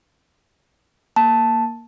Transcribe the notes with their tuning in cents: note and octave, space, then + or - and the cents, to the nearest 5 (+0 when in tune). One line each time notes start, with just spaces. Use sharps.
A#3 +0 A5 +0